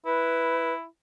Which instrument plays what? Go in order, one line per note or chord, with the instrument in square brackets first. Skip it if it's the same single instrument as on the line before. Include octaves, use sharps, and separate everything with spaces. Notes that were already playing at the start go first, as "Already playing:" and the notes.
[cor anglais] E4 [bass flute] B4